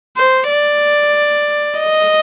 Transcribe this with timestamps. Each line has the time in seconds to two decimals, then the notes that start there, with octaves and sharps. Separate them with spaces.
0.17 C5
0.49 D5
1.79 D#5